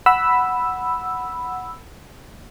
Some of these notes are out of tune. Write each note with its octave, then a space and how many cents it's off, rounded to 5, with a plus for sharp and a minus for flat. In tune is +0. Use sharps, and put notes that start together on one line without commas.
F#5 +0 B5 +0 E6 +0